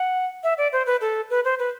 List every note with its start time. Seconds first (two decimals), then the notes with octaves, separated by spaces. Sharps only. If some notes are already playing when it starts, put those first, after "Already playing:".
Already playing: F#5
0.44 E5
0.58 D5
0.73 C5
0.86 B4
1.01 A4
1.30 B4
1.45 C5
1.59 B4